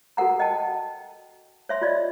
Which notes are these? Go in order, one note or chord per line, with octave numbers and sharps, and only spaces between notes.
F#4 A4 A#4 F#5 A#5
D#5 G5 A5
C#5 E5 C6
F4 D5 D#5